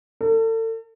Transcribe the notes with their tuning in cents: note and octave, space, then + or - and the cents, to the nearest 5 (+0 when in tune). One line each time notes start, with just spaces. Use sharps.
A4 +40